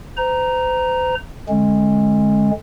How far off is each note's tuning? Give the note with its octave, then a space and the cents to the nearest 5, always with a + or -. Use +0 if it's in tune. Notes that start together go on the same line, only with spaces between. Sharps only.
C5 -40 A#5 +0
D3 +0 G#3 +10 C#4 -30